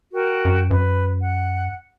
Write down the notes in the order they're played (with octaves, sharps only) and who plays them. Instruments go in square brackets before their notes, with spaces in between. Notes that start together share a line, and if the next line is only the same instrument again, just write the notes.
[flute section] F#4 A#4 G5
[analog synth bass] F#2
[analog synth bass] F#2 [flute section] B4
[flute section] F#5